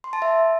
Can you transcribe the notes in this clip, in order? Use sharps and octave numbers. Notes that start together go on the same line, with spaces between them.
C6
A5
E5